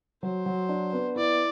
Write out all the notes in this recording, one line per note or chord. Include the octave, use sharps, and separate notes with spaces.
F#3 C5
F#3
D4
B3
E4 D5